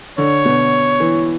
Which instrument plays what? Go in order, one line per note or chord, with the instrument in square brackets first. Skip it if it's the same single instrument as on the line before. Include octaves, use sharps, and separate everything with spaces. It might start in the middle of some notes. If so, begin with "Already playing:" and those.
[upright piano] D3 [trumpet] C#5
[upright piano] B2
E3